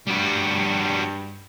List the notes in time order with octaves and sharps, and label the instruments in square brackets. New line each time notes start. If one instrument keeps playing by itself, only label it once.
[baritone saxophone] G2 [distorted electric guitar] G3 F#4